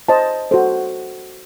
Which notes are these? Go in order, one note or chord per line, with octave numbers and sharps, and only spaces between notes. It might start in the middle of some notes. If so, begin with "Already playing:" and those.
C5 D#5 A5
F#4 A4 C5